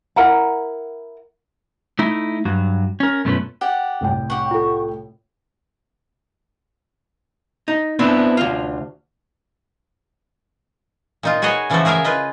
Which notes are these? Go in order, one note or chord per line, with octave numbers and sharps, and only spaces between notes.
E4 A#4 F#5 A#5
A3 D#4 E4
G2 F#3
C#4 A#4
F#2 B2 A3 C#4 F4 B4
G4 D5 F#5
C2 A2 G5
G4 F#5 C#6
F4 A4
D#4
B3 C4 D4 E4
D2 F4
A#2 D#4 F4
F#4 G#4 B4 C#5 D#5
C#3 E3 F3 A3 F#4 A4
E4 G#4 A#4 E5 F5
F4 B4 D#5